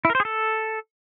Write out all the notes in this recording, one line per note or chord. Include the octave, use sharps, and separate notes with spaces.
E4
A#4
C5
G#4
A4